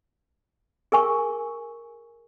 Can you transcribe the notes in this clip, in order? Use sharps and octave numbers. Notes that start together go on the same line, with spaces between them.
G#4 A#4 G#5 C#6